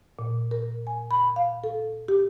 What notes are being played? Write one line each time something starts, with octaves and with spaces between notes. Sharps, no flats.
A#2
A#4
G#5
B5
F5
A4
G4